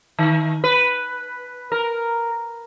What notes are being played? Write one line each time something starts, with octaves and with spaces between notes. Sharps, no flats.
D#3
B4
A#4